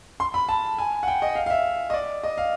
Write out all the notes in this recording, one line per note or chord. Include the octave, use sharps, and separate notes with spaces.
C6
B5
A5
G#5
F#5
G5
D#5
F5
F5
E5
D#5
D5
D#5
F5